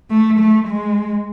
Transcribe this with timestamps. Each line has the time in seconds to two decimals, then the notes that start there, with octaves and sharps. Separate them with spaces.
0.10 A3
0.39 A3
0.67 G#3